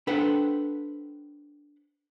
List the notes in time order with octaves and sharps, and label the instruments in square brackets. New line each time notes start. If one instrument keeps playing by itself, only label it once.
[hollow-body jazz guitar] D4 A4 B4 C5 F#5 G5